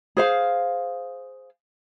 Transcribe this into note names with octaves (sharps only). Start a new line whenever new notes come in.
G#4 C5 F5